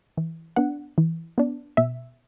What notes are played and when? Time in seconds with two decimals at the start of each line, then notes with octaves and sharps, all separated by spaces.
0.17 E3
0.56 B3 D4 F#5
0.98 E3
1.38 B3 D4
1.77 B2 E5